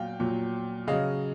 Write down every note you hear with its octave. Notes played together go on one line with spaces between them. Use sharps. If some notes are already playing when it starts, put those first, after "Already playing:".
Already playing: A#2 F#3 F5 G5
A#2 F#3
C#3 F#3 D#5 F5